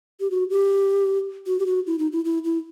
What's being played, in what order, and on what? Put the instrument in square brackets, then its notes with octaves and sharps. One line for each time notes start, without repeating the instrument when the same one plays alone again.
[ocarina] G4
F#4
G4
F#4
G4
F#4
E4
D#4
E4
E4
E4